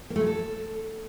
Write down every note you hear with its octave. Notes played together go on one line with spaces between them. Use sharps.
A#3
A3
F#3
A4